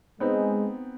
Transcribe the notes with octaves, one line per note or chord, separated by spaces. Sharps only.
G#3 B3 C4 D#4